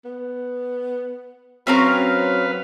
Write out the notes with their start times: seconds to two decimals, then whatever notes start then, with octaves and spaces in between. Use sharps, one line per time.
0.05 B3
1.67 F#3 C4 C#4 A#4 B4 F5